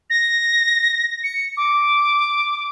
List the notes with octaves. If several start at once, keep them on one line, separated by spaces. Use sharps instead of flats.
A#6
C#7
D6